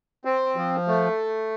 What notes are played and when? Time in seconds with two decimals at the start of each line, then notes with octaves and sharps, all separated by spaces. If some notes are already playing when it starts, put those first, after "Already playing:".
0.25 C4
0.56 F3
0.88 A3